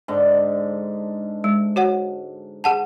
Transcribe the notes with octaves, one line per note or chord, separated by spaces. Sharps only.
G#2 D3
G#3
F#4 C#5 F#5
G#4 F#5 A5